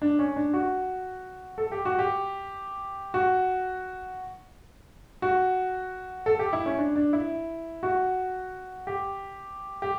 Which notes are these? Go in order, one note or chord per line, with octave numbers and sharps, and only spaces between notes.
D4
C#4
D4
F#4
A4
G4
F#4
G4
F#4
F#4
A4
G4
E4
C#4
D4
D4
E4
F#4
G4
G4